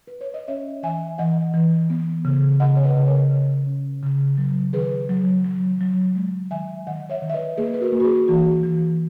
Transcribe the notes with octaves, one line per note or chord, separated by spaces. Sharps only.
B4
C#5
D#5
C#4 C#5 E5
E3 E5 G#5
E3 D#5 F#5
E3
B3
C#3
C#3 D#5 F#5
C#5
B4 D#5
C#3
A#4 C#5
C#3
C#4
C#3
F#3
D#3 G#4 B4
F#3
F#3
F#3
G#3
D#3 E5 G#5
D#3 D#5 F#5
C#5 E5
D#3
E5
B4 D#5
A#3 G#4 B4
B4
F#4 A#4
A#3
F#4
G#4
E3 F#4
E3